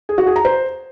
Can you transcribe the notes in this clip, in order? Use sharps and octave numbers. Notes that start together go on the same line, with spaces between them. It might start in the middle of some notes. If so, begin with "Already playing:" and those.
G#4
F#4
G#4
A#5
C5